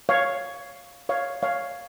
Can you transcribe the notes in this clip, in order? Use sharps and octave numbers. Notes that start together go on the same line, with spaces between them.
C#5 F5
C#5 F5
C#5 F5